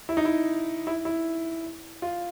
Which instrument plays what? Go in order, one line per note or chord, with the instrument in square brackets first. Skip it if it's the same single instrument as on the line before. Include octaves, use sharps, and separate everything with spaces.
[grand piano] E4
D#4
E4
E4
E4
F4